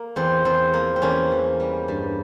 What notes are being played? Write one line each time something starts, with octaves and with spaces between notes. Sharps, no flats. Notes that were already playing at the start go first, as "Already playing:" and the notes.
Already playing: A#3
E2 C4
E2 C4
F3 A#3
C4
E2 A#3 C#4
E3
G3
G2